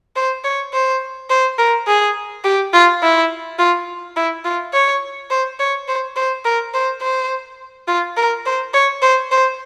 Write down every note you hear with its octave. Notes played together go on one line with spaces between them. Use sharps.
C5
C#5
C5
C5
A#4
G#4
G4
F4
E4
F4
E4
F4
C#5
C5
C#5
C5
C5
A#4
C5
C5
F4
A#4
C5
C#5
C5
C5